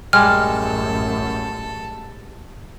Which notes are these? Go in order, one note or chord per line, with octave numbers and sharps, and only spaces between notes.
A1 F#2 G3 G#3 A4 F6